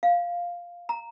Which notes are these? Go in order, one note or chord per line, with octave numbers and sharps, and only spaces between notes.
F5
A#5